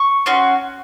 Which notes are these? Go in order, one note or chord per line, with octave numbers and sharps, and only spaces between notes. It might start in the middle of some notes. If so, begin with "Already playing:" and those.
Already playing: C#6
C#4 F#4 C6